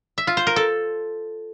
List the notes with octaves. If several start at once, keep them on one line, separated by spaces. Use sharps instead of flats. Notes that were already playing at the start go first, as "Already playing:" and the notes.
E5
F4
C5
A#4
A4